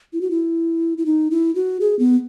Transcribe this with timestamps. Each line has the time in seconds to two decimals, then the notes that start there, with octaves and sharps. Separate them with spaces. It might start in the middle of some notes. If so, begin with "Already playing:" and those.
0.13 E4
0.21 F#4
0.31 E4
0.98 E4
1.06 D#4
1.31 E4
1.55 F#4
1.81 G#4
1.99 B3